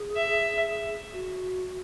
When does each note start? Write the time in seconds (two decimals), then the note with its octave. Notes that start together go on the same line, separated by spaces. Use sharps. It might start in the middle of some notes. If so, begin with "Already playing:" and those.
Already playing: G#4
0.16 E5
1.12 F#4